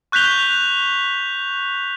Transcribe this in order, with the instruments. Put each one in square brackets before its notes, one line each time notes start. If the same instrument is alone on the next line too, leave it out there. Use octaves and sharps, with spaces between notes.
[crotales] C#6 F#6 G6 B6 F7 G7